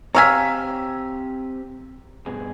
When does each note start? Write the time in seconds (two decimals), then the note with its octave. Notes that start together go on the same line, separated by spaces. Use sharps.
0.15 C4 G4 C#5 F5 G#5 A#5 E6 B6
2.26 G2 B2 G#4